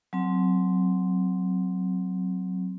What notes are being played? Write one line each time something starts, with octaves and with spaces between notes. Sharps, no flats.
F#3 C4